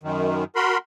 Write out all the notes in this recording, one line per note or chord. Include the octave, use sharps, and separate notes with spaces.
F#2 D#3
F#4 A#4 B5 C6